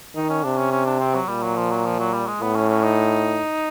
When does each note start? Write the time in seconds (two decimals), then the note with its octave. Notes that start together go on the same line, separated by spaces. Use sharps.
0.15 D#3 D#4
0.29 C#4
0.44 C3 D4
0.57 C#4
0.72 C#4
0.86 D4
1.00 C4
1.14 F#3
1.28 A#2 G3
1.43 F#3
1.56 F3
1.71 F#3
1.85 F3
1.99 F#3
2.14 G3
2.27 G#3
2.41 A2 B3
2.56 C#4
2.70 C#4
2.84 D#4